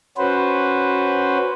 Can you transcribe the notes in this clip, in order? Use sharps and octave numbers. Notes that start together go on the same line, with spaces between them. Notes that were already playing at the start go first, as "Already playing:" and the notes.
C#4 F#4 B4 C5